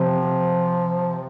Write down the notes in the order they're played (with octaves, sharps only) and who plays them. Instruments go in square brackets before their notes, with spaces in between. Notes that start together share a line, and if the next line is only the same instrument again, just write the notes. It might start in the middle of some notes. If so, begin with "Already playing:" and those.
Already playing: [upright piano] C3 [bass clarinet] F3